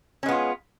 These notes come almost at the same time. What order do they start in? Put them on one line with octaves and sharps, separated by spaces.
C#4 G#3 B3 F4